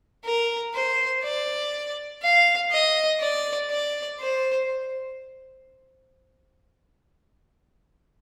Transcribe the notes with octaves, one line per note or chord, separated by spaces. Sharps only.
A#4
C5
D5
F5
D#5
D5
D5
C5